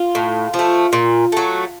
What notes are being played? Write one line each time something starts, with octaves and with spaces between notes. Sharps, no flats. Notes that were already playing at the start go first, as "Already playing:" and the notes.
Already playing: F4
A2
F3
A3
A#2
F#3 A3